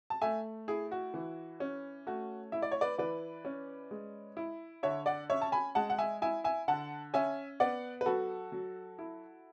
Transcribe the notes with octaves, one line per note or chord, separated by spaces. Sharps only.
A5
A3 E5 G#5
E4 G#4
F#4
E3
C#4
A3 F#4
E4 E5
D5
C#5
B4 D5
E3 B4 D5
C#4
G#3
E4
D3 C#5 E5
D5 F#5
C#4 C#5 E5
A5
G#5 B5
G#3 F#5 A5
F#5
E5 G#5
E4 E5 G#5
E5 G#5
D3 F#5 A5
C#4 E5 G#5
B3 D5 F#5
B4
F#3 F#4 A4
F#3
E4